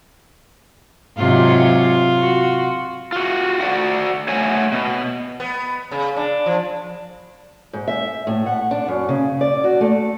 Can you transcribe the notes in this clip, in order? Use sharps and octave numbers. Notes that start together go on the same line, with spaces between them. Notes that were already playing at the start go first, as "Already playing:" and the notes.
G#2 C3 F#3 F4
F#4
F4 F#4
F#4 D5 F#5
A3 C#5 F#5 G#5
B2
B3
C#3
D4
F3
G#2
E5
A2
F#5
D4
F#2
C#3
D5
F#4
A3